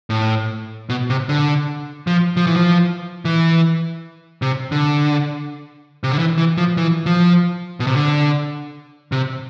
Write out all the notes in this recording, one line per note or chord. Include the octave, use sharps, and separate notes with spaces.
A2
B2
C3
D3
F3
F3
E3
F3
E3
C3
D3
C3
D3
E3
E3
F3
E3
F3
B2
C3
D3
C3